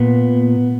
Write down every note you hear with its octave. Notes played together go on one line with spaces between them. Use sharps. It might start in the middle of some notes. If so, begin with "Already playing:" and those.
Already playing: A#2 B3